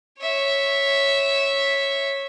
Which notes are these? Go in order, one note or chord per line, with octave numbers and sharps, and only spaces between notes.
C#5 E5